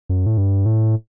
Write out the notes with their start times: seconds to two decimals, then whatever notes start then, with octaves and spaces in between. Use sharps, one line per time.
0.09 F#2
0.26 A2
0.38 G2
0.66 A2